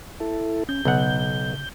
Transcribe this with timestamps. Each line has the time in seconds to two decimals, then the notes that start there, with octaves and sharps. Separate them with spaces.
0.20 E4 A4
0.69 C#4 G6
0.85 B1 C#3 F#5